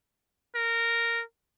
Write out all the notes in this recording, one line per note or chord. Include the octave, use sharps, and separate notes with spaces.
A#4